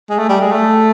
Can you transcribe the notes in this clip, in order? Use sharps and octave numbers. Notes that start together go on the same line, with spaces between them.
G#3
A3
G3
G#3
A3